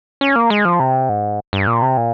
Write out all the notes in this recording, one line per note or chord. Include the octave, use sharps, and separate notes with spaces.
C#4
A#3
G#3
F3
C3
G#2
G2
A#2
C3
A#2